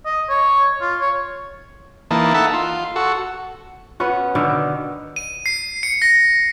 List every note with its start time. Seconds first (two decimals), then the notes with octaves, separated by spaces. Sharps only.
0.05 D#5
0.29 C#5
0.81 F4
1.01 C#5
2.11 E3 A#3 D#4 A5
2.34 D#4 A4 E5 F#5 A5 B5
2.53 F4
2.96 F#4 A4
4.00 B3 C#4 F#4
4.35 B2 D3 D#3
5.16 D#7
5.46 C7
5.83 C#7
6.02 A#6